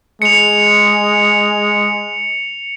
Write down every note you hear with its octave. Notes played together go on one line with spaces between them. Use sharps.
G#3 C#7 F7